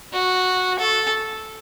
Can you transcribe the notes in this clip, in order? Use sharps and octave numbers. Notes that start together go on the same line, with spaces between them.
F#4
A4